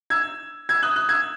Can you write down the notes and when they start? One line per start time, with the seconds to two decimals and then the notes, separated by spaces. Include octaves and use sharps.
0.10 E6 G#6
0.69 E6 G#6
0.83 D#6 F#6
0.96 D#6 F#6
1.09 E6 G#6